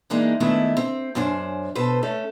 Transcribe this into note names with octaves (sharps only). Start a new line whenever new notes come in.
E3 G#3 A#3 D4 D#4
D#3 G#3 A3 B3 D4 E4
C4
F#2 C#4 D4 C5
B2 A4 B4 C5
A3 C#4 A4